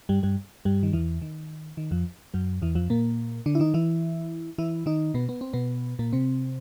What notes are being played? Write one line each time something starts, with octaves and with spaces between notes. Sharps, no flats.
G2 G3
G2 G3
G2 G3
D#3
E2 E3
D#3
D#3
F2 F3
F#2 F#3
E2 E3
F2 F3
A#2 A#3
D3 D4
E4
D#3 D#4
E3 E4
E3 E4
D#3 D#4
B2 B3
B3
C4
B2 B3
A#2 A#3
C3 C4